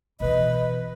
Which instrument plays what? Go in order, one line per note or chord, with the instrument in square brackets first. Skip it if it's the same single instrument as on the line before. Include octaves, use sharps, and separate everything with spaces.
[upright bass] B2 E3 [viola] B4 [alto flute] D#5